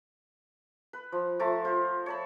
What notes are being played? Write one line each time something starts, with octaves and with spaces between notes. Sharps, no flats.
B4
F3
F3 A3 A5 A#5
F4 C5
C#5 A5 B5